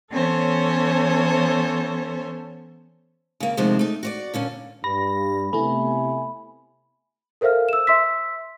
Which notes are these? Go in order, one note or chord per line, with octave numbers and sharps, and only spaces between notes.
E3 B3 C#4 A4 C5 C#5
C#3 A#3
D2 C3 D#3 F3 G#3 C4
A3 D#4
F#4 C#5 D5
A#2 D3 C#4
G2 B5 A#6
C3 A3 B3 E4 E5 G#5 B5
A4 A#4 C5 E5 F5 F6
E6 E7
E5 C6 E6 B6